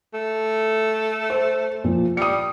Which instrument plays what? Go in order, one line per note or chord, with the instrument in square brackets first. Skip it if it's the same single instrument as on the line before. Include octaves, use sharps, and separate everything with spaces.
[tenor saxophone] A3
[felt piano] C5
A#2 F3
[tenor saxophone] G3 [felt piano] D#6 C#7